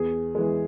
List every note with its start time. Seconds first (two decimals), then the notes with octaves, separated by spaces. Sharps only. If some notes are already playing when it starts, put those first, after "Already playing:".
Already playing: E2 G#4
0.35 E3 G#3